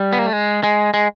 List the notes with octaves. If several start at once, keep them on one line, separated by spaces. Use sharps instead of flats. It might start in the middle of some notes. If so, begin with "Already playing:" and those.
Already playing: G3
B3
A#3
A3
G#3
G#3
G#3